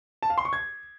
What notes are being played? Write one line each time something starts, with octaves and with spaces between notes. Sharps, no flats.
A5
F5
C6
C#6
G#6